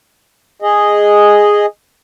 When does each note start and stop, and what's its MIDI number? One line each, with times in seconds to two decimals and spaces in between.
0.62 1.66 68
0.62 1.66 75